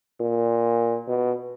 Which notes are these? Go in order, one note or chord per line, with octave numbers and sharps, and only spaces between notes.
A#2
B2